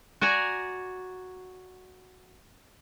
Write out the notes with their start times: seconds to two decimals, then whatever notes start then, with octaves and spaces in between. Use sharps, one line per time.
0.21 F#4 D5 G#5 A#5